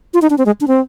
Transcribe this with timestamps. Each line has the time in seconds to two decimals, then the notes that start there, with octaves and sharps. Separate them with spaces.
0.14 F4
0.22 D#4
0.30 D4
0.38 C4
0.46 G#3
0.61 D4
0.68 C4